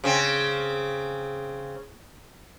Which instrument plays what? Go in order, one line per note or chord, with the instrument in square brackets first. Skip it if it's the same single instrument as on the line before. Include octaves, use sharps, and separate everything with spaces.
[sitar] C#3 C4